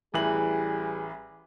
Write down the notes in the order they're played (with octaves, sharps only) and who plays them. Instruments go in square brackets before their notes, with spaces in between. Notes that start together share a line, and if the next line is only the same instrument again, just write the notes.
[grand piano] A1 E3 F#7 [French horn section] G3 G#4